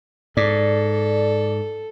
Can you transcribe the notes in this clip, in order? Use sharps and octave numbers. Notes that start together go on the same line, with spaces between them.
G#2 A4 D5